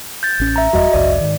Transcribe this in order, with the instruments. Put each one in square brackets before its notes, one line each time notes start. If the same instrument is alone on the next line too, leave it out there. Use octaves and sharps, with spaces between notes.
[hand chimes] G6 A6
[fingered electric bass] A1 C#4
[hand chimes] E5 A#5
[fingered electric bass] F1 E2 G3 [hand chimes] F#4 D#5 E5
[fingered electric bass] G#1 C#2 F#2 [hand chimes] D5
[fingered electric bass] G#2 D#3